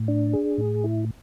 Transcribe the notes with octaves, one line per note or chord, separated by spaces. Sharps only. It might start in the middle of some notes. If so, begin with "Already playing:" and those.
Already playing: A2
D4
G#4
A2
E4